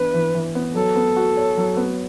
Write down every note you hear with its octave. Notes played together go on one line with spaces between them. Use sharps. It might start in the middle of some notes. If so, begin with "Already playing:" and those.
Already playing: E3 B3 D4 B4
E3
E3
B3
F#3 A4
B3
F#4
C#5
F#3
B3